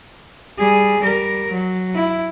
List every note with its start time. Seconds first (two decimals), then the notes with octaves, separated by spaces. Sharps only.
0.58 G3 G#4
1.01 G3 A#4
1.51 F#3
1.95 E4